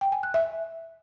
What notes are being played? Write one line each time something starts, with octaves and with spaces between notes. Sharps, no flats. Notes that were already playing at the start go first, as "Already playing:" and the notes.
G5
G#5
F#6
E5